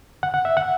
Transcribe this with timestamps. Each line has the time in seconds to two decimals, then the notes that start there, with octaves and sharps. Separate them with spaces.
0.23 F#5
0.34 F#5
0.45 E5
0.57 F#5